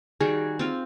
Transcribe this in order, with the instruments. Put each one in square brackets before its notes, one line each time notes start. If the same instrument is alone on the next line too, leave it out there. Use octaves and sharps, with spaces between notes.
[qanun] D#3 G3 F#4 [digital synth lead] G#4
[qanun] C4 F4 F5